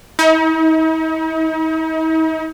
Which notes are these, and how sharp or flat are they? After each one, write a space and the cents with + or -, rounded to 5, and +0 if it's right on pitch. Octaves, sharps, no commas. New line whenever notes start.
D#4 +45